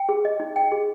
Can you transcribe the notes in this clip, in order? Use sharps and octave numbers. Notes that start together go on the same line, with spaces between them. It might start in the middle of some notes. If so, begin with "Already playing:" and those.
Already playing: G5
G#4
D#5
D#4
G5
G#4